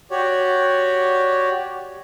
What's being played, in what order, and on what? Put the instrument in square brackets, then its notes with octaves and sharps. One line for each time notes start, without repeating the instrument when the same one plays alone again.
[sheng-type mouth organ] F#4 G4 C#5 D5